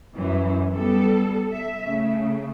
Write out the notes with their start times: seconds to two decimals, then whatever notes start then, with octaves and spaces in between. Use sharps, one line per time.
0.15 F#2 E3
0.73 G3 B3 A4
1.51 E5
1.85 C#3 A3